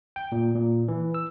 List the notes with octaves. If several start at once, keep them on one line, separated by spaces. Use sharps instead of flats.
G5
A#2
A#2
E3
E6